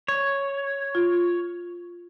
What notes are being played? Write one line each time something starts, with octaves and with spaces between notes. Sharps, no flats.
C#5
F4